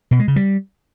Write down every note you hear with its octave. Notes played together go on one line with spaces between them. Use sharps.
B2
G#3
C#3
G3